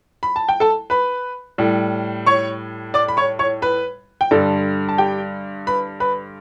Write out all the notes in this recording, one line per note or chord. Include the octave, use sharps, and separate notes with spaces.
B5
A5
G5
A4 A5
B4 B5
A2 G3
C#5 C#6
D5 D6
B5
C#5 C#6
C#5 C#6
B4 B5
G5
G2 D3 G3 A4 A5
A5
G4 G5
B4 B5
B4 B5